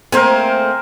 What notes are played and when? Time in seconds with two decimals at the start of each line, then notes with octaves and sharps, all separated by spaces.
0.12 A3 A#3 C4 A#4 C5 G#5